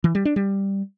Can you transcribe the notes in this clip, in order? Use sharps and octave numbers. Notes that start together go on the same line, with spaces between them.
E3
G3
D4
G3